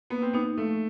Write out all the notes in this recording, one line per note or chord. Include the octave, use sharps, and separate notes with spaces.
A#3 B3
C4
B3 D#4
F3 A3